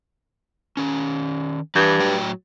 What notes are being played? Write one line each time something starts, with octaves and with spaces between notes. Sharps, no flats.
D#3 C#4
G2 E3 B4
A2 F#3 G5